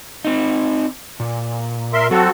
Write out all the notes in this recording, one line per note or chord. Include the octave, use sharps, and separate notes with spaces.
C4 D#4
A#2
A#4 E5 C6
F#3 C4 F#4 A4